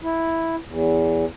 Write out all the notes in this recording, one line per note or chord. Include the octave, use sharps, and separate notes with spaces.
E4
E2